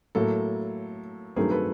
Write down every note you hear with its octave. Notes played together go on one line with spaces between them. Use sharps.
A2 F#3 A#3 A4
G2 D#3 F#3 A3 C4 G#4 A#4
A4 B4